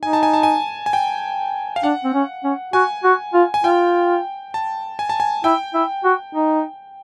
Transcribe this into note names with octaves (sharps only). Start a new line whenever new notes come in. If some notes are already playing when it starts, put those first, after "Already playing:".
D#4 G#5
A5
G#5
A5
G#5
G#5
G5
F5
D4 F#5
C4
C#4
C#4
F#4 G#5
F#4
F4
G#5
F4 G5
A5
G#5
A5
G#5
E4 G5
E4
F#4
D#4